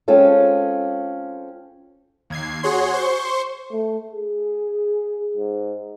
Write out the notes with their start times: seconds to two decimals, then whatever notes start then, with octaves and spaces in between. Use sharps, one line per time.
0.08 G#3 C4 C#4 F4 A4
2.30 D#2 G#6 C7
2.63 F#4 G#4 C#5 C6
2.93 C5 C6 C#6
3.71 A3
4.11 G#4
5.37 G#2